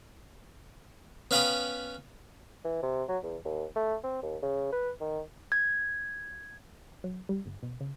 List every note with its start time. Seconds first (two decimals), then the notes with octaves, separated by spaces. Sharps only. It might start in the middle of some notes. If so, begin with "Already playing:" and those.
1.31 B3 C#4 F5 G5 B5 D#6
2.65 E3
2.83 C3
3.09 F#3
3.23 E2
3.45 D#2
3.76 A3
4.04 C4
4.22 D#2
4.42 C#3
4.72 B4
5.00 D#3
5.52 G#6
7.04 F#3
7.29 G3
7.46 G1
7.63 B2
7.80 C#3